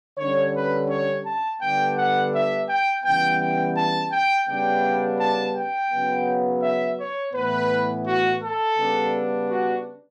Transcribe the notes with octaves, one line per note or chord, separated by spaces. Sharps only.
D3 G3 C#4 C#5
B4
C#5
A5
D3 G3 B3 D4 G5
F#5
E5
G5
C#3 E3 G3 B3 G5
G5
A5
G5
C#3 G3 B3 D4 G5
A5
G5
C#3 F#3 B3
E5
C#5
A2 E3 B3 B4
F#4
A4
C#3 G3 B3 D4
F#4